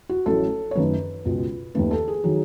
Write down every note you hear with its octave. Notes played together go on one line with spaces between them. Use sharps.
F#4
A1 A2 F#3 A3 A4
C#5
F#2 D#3 A3 B4
C#2 B2 G#3
D#2 D#3 A3 B4
A4
G#4
D#3 F#3